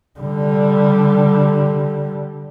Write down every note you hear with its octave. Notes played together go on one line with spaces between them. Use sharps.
D3 G3